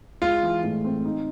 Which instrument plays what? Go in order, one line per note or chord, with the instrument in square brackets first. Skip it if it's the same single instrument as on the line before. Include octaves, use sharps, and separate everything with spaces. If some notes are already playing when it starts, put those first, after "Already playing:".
[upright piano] G#3 [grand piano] F4
[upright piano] E3
A2
C4
D#4